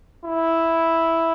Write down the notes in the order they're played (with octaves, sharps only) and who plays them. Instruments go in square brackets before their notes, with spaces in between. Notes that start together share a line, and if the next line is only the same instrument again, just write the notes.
[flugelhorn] E4